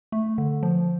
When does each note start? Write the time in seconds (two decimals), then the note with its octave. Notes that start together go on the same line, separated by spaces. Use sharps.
0.12 A3
0.38 D3
0.63 F3